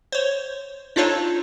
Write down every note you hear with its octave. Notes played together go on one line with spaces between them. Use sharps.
C5 C#5
D4 D#4 F4 A4 C5 C#5